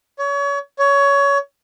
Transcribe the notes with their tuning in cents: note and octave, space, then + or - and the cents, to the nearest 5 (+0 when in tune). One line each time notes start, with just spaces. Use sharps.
C#5 +30
C#5 +20